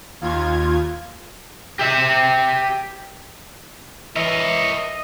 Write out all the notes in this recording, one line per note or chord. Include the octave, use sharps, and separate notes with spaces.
D#2 F4 G#6
G4 E5
E3 A#4 C#5 D#5 E5